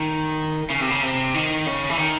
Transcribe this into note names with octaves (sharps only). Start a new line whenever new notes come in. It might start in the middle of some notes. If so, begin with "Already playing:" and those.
Already playing: D#3
C#3
C3
C#3
C3
D#3
C#3
E3
D#3